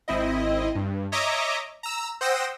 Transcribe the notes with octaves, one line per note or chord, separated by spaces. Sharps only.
G#1 C4 E4 D#5
G2
C#5 D#5 E5 A#5 D6
A#5 E6
C5 F#5 G5 D#6 E6 A#6